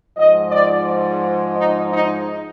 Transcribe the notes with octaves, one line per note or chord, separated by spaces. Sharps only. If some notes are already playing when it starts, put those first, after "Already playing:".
G#2 F3 D#5
D5
D#4
D#4